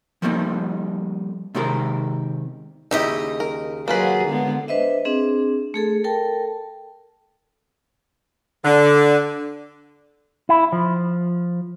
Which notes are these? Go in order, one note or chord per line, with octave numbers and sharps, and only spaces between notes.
F3 G3 A3 A#3 C4 D#4
C3 D#3 G#3 C4 G4 A#4
D#2 C#3 D#4 E4 G4 D#5
A#4
F#3 A#3 F4 F#4 G#4 B4
D3 G#3 B3
D4 B4 C5 D#5 E5
C4 D4 G#4
A3 G#4 A4
A4 A#4 G5 A5
D3
E4
F3